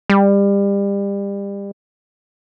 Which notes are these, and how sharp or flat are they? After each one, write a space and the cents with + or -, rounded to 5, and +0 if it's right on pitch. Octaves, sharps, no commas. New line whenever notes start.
G3 +30